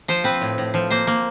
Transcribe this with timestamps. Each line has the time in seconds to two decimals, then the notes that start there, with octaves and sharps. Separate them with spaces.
0.08 F3 C5
0.24 C4 B4
0.41 A2
0.58 A2
0.74 F3
0.90 A#3 C5
1.07 A#3